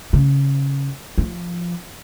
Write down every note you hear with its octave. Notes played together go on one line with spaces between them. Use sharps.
C#3
F3